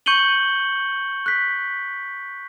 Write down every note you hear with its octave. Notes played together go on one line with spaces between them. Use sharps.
C#6 G6 C#7 D#7 F#7 G7
F#6 B6